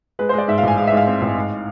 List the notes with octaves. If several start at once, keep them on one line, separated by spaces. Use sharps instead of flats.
G#3 B4
C5
G#3
D5
G#2 E5
F5
A1 G#5
G#3 F5
E5
G#2 F5
C4
A1
G#2